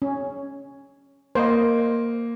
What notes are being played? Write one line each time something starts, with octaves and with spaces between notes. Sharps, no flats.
C#4
A#3 C5 D#5